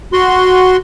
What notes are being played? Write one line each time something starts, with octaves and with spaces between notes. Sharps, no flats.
F#4 C6